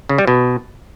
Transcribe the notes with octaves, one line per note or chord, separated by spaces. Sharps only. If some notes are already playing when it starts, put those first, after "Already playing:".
C#3
G3
B2